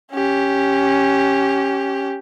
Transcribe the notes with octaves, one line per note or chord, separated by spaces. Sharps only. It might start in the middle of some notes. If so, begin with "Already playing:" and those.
C#4 G4